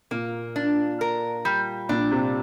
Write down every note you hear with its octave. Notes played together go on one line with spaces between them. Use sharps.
A#2 A#3
D4
A#4
G3
A#2 D4
C3